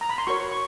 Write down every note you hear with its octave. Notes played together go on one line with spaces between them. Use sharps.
A#5
B5
C6
F#4 A#4 C#5 C#6
C#6